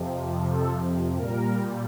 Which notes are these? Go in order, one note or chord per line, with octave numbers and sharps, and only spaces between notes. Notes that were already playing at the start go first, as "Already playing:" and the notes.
Already playing: F2 C3 F3
A4
A#2 G3 A#4